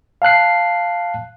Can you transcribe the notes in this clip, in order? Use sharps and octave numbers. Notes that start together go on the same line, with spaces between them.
F5 A5 F#6 C7